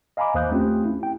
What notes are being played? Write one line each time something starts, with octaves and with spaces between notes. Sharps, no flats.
D#5 F5 G#5 A#5 B5 D6
D#2 C5 D#6 F#6 G6
A3 C4 C#4 F4 G4
E4
G5